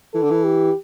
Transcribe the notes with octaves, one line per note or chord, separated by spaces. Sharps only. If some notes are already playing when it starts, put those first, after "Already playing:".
E3 A4
D3
E3
G4